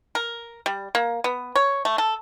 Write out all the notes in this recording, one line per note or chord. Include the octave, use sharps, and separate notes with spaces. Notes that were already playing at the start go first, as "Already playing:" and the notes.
A#4
G3
A#3
B3
C#5
A3
A4